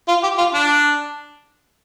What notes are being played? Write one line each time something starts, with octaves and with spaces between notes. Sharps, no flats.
F4
G4
F4
D4